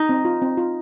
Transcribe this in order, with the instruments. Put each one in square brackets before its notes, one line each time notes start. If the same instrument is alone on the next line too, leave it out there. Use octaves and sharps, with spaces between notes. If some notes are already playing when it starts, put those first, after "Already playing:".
Already playing: [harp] D#4
[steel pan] C4
F4
C4
F4